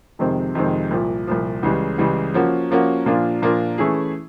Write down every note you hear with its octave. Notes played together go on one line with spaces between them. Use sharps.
F2 C3 D#3 G#3 C4
F2 C3 D#3 G#3 C4
C2 A#2 F3
C2 A#2 F3
C#2 C#3 E3 G3
C#2 C#3 E3 G3
F3 A#3 C#4 F#4
F3 A#3 C#4 F#4
A#2 F3 A#3 D4 F4
A#2 F3 A#3 D4 F4
E3 A3 C#4 E4 G#4